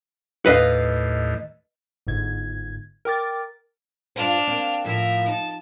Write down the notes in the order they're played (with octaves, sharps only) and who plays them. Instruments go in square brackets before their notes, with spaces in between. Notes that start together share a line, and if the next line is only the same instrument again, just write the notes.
[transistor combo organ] D#2 A2 [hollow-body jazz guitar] B4 D#5 F5
[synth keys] G1 G#2 G#6
A#4 G5 D6 A6
[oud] G2 F4 C5 [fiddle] D4 F6
[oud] A#3 C4
[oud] A2 F3 A#3 [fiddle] A#4 E5
[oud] D#4 [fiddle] A5